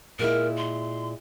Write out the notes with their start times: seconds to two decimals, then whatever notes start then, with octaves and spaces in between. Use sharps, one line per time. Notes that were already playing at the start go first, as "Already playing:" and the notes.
0.19 A#2 G#3 E4 A#4
0.57 C6